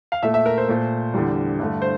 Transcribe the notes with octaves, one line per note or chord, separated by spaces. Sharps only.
F5
A#2 A3 E5
E5
A#4
C5
A#2 A3
E2 D3 G3
G2 D3 A3
C5